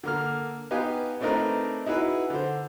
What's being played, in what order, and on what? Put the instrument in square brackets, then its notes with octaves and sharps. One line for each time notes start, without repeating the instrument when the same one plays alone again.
[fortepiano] D3 A#3 F6
B3 D#4 G4 B4 F5 G#5
A3 C4 D4 D#4 A#4 B4
D#4 E4 F#4 G#4 B4
D3 C5